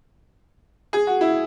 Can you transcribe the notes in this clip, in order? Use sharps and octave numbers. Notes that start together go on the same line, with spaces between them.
G#4
F#4
E4